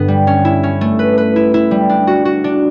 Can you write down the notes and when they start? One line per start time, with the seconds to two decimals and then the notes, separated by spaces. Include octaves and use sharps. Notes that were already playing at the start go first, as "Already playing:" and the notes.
Already playing: G2 D3 B3
0.08 G3
0.27 C#4
0.45 E4
0.63 C#4
0.81 A3
0.99 B4
1.18 B4
1.36 E4
1.54 E4
1.71 G3
1.89 D4
2.07 F#4
2.25 F#4
2.44 D4